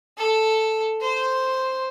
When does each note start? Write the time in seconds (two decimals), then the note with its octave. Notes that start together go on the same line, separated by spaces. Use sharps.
0.17 A4
1.01 C5